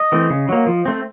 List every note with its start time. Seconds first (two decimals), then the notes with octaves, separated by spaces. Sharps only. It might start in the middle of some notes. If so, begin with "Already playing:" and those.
Already playing: D#5
0.12 E3 A3 C4
0.30 C#3
0.49 F#3 A#3
0.67 F3
0.85 A3 C4